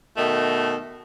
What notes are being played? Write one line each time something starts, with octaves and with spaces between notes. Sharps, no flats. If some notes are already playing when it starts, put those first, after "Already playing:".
B2 D#3 A3